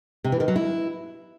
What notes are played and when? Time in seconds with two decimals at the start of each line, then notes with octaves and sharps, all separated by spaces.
0.24 C3
0.32 E3
0.40 D#3
0.48 F#3
0.56 E4